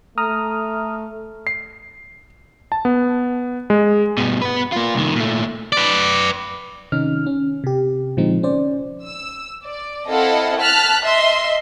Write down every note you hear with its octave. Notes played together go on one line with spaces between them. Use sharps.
A3 A#5 D#6 F6
C7
A5
B3
G#3
G2 B2
B3 B4
A#3 F4
C2 D#3
A#2 A3
B4 D5
C3 D#3 C#4 D#4 F6
C#4
C3 G4
A#2 D3 F3 G#3 C4 D#4
C#4 C5 D5
E6
D5
C4 E4 A4 D#5 F5 F#5
A5 F6 F#6 B6
D#5 E5 C6